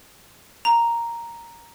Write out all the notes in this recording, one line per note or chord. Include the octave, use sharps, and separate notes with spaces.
A#5